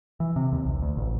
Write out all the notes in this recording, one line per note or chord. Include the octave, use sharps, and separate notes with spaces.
E3
C3
D#2
B1
D2
A1